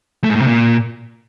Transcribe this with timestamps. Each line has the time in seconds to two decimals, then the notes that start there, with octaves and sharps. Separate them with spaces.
0.24 A3
0.30 G#2
0.36 A2
0.41 C3
0.47 A#2